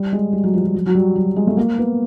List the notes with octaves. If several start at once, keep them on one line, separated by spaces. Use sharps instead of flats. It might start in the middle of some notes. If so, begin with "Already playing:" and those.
Already playing: G3
G#3
G3
F#3
F3
F3
F#3
F#3
G3
F#3
G#3
A3
A#3
B3